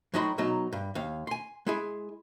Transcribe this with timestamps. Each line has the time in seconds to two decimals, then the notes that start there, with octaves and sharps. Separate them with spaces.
0.14 A2 F#3 D#4 F#4 B5 C6
0.38 B2 F#3 D#4
0.73 G2
0.95 D#2 F5
1.27 G#5 C6
1.67 G#3 E4 G#4